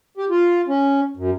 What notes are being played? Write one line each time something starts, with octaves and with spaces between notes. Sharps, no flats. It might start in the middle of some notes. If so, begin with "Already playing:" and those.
G4
F4
C#4
F#2